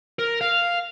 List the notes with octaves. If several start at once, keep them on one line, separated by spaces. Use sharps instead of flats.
A#4
F5